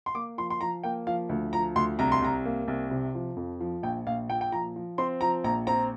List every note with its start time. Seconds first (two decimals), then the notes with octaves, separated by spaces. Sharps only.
0.06 C6
0.15 A#3 D6
0.38 F3 C6
0.50 C6
0.61 F3 A#5
0.83 A#3 G5
1.07 F3 F5
1.29 D2
1.53 F3 A#5
1.76 D2 C6
1.99 C2 A#5
2.12 C6
2.22 C2 A#5
2.45 A#3
2.68 C2
2.91 C3
3.15 F3
3.36 F2
3.60 F3
3.83 A#1 G5
4.06 A#1 F5
4.29 A#2 G5
4.41 G5
4.52 F3 A#5
4.76 F3
4.98 C4 C6
5.21 F3 A#5
5.44 A#1 A#5
5.67 C4 A#5